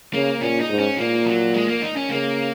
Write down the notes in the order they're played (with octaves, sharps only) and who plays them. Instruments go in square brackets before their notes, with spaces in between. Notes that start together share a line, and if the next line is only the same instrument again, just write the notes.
[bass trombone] C#3 [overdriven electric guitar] A#3
[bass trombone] A#2 [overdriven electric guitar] C#4
[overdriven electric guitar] D#4
[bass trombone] G#2
[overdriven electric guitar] C#4
[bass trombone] A#2 [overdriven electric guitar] A#3
[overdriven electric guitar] F#3
G#3
A#3
D#4
C#4
[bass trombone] C#3 [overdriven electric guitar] A#3